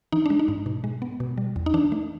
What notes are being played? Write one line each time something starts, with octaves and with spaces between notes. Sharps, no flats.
E3 D#4
D4
G#3
D#4
G#2
B2
G#3
B3
B2
G3
E2
D#4
E3 D4
A3